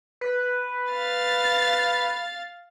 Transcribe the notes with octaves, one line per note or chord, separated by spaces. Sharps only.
B4
F5 A6